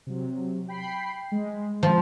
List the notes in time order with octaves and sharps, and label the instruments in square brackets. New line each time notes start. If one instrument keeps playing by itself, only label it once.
[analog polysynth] C3 F#3
G5 B5 C7
G#3
[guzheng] F3